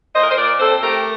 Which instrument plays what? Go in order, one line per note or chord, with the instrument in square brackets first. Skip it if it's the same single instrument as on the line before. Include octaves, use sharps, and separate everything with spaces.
[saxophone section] A#2 C5 D#5
A#4
C5
A#2 A#4 D5
C4 A4 C5
A3 G4 A#4